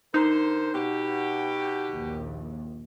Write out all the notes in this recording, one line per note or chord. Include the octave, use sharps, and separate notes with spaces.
D3 D#4 A#4 C5
B2 G4
A#1 D#2